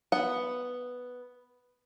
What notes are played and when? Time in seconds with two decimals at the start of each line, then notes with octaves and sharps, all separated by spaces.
0.12 B3 F#5